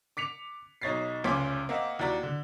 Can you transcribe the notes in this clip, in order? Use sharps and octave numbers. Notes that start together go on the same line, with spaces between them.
D6 B6 C#7 F7
B1 D#4 C#5 A6 B6 C7
F1 C#2 C#4 C6 D6 B6
A#3 C4 D#5 E5 F#5
D#2 E4 F#4 D5 A#5 B6
D3